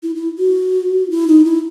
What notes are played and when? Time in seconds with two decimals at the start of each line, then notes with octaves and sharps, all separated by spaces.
0.03 E4
0.15 E4
0.39 F#4
1.10 E4
1.28 D#4
1.45 E4